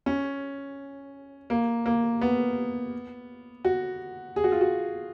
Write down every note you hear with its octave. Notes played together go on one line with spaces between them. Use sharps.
C#4
A#3
A#3
B3
F#4
G#4
F#4
F4
F#4